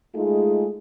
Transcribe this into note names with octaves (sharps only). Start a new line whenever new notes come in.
G#3 A3 D#4 F4 G#4